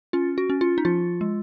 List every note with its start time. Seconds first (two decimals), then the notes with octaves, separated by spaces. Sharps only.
0.13 C#4 F4
0.38 F#4
0.50 C#4
0.61 F4
0.78 D#4
0.85 F3 F4
1.21 G#3